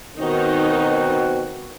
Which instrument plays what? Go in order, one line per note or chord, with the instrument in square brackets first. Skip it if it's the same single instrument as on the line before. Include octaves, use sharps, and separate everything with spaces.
[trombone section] B2 C4 F#4 [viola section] D#3 D#4